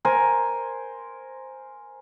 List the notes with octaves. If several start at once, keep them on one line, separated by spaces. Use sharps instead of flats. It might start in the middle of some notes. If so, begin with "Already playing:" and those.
A#4 C5 G#5